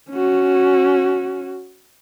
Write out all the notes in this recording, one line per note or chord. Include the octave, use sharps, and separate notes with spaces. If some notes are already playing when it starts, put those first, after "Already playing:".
C#4 F#4